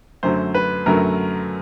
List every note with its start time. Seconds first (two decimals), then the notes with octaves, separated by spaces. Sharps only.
0.23 F#2 D3 F#3 A3 C5
0.55 B4
0.86 F#2 D3 F#3 A3 A#4